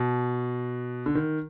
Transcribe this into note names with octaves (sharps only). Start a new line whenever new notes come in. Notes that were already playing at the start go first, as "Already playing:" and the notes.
Already playing: B2
D3
D#3